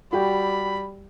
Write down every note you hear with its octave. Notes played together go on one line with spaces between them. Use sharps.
G3 F#4 G4 G5 B5